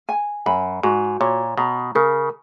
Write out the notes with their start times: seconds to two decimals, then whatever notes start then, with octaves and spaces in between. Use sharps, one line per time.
0.09 G#5
0.46 F#2 B5
0.83 G#2 F#4
1.20 A#2 C#5
1.58 B2 A#5
1.95 C#3 A#4